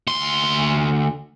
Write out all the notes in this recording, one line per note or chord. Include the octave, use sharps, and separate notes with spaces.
D2 C6